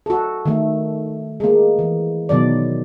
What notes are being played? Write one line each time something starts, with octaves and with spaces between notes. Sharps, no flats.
F#4 A4
D#3 A3
G#3 A#3
E3
B2 D#3 F#3 D5